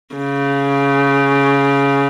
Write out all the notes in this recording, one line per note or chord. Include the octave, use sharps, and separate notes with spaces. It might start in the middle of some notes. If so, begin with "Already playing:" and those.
C#3